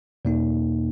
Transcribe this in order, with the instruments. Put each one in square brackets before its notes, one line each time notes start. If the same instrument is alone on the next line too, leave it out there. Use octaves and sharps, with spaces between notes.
[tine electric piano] E2 B2 A#3 D#4